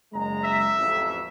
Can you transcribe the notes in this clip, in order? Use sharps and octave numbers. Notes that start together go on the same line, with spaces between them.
F#1 G#3 A#5
E5
A1 F2